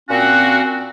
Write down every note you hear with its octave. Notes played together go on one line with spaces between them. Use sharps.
A#2 C4 C#4 F#4